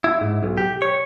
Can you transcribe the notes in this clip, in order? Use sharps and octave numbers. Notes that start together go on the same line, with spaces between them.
E4
G#2
B1
G4
C#5